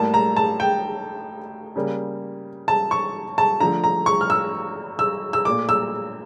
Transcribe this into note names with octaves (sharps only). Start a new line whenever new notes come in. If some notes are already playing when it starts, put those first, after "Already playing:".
Already playing: A2 G3 A#3 A5
A#5
A5
G5
C#3 G3 A#3
A5
C#6
A5
D3 F3 A3 A#5
A#5
C#6
F6
E6
E6
E6
A#2 A3 D6
E6